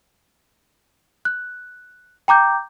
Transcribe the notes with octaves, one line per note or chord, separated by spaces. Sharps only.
F#6
G5 A#5 D6 G6